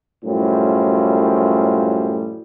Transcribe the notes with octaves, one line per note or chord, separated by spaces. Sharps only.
F#2 A2 F3 G3